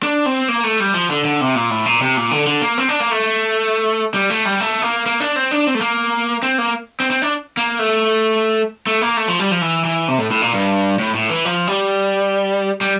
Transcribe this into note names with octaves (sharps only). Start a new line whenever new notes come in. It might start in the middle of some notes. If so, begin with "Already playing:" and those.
D4
C4
A#3
A3
G3
F3
D3
D3
C3
A#2
A2
A#2
C3
A#2
D3
D3
A#3
C4
D4
A#3
A3
G3
A3
G3
A3
A#3
A#3
D4
C4
D4
C4
A3
A#3
C4
A#3
C4
C4
D4
A#3
A3
A3
A#3
A3
F3
G3
F3
E3
E3
C3
A2
A2
A#2
G2
A2
A2
E3
F3
G3
G3